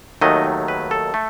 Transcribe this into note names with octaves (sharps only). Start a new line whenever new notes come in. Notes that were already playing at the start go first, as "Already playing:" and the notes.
D#2 D#3 F#3 A3 D#5
B4
A4
A3